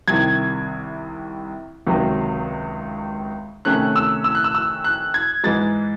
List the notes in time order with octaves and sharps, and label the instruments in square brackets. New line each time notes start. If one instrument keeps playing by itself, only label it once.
[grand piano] C2 C3 D#3 G#6
C#2 C3 D#3 F#3
C3 D#3 A3 C#4 F#6
E6
E6
F#6
E6
E6
F#6
G#6
G#2 E3 G#3 A6